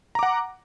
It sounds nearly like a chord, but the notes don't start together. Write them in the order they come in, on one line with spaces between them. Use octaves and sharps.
A#5 D6 F#5